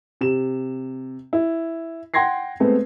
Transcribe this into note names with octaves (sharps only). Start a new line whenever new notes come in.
C3 E7
E4
F#5 G5 C6 G#6 A#6 C7
G#3 A3 B3 C4